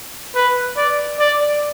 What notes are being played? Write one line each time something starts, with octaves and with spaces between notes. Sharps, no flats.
B4
D5
D5